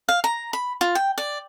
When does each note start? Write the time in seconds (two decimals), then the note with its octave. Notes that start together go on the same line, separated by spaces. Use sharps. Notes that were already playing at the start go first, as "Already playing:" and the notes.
0.09 F5
0.24 A#5
0.53 B5
0.81 F4
0.95 G5
1.18 D5